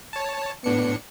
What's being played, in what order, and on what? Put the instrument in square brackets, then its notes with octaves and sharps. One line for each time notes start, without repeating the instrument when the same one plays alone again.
[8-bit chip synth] C#5 A5
[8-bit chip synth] A2 D4 C#7 [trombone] B3